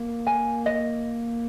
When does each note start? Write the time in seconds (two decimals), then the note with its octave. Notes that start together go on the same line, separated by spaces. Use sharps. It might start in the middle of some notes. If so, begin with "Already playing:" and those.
Already playing: A#3
0.27 G#5
0.66 D#5